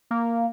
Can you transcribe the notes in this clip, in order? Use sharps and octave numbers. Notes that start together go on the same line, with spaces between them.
A#3